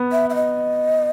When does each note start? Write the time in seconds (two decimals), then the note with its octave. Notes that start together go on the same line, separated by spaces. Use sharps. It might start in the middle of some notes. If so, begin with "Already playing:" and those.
Already playing: B3
0.12 E5
0.30 E5
0.35 D#5